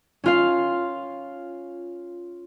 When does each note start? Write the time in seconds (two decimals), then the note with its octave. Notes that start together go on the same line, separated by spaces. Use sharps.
0.24 C#4 F4 F5